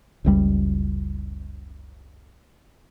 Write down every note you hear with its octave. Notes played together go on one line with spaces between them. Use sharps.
F#1 C#2 G3